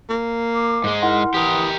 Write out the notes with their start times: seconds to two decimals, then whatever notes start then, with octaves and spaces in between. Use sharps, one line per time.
0.10 A#3
0.55 D6
0.84 G#2 G#3
1.02 E4 A#4 F#5 C6
1.34 E3 G4 A#4 D#6